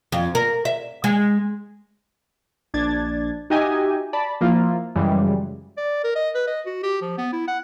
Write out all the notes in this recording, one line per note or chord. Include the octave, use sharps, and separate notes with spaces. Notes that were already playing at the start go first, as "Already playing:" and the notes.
F2
A#4
E5
G#3
A#1 D4 G#6 A6
D#4 F#4 G4 D#5 E5 G#5
D5 A5 B5
F3 A#3 E4 F4
F#2 C#3 E3 G3 G#3
D5
A#4
D#5
B4
D#5
F#4
G4
F3
B3
E4
F#5